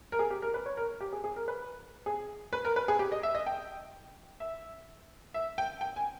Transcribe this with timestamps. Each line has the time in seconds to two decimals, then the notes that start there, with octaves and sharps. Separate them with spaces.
0.12 A#4
0.19 G#4
0.30 G4
0.42 A#4
0.54 B4
0.66 C#5
0.77 A#4
1.01 G4
1.13 G#4
1.24 G#4
1.36 A#4
1.48 B4
2.06 G#4
2.53 B4
2.65 A#4
2.76 B4
2.88 G#4
2.99 G4
3.12 D#5
3.23 E5
3.35 D#5
3.46 G5
4.40 E5
5.34 E5
5.58 G5
5.81 G5
5.96 G#5